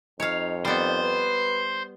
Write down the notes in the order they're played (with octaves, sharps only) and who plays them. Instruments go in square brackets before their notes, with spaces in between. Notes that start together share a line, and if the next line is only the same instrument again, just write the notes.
[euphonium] F2 [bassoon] D#4 [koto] C#5 F5
[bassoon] D#3 [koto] G3 B3 [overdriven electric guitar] C5
[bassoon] B4